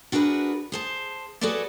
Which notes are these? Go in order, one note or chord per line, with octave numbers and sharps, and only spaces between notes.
D4 F#4 G#4 A#4 B4
G#4 C5 A5
F#4 G#4 A4 B4 C#5 D5